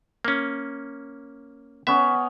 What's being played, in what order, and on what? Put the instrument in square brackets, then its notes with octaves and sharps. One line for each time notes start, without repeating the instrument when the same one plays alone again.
[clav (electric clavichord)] A#3 C#4
[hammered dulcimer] B3 C#4 [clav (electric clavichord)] E5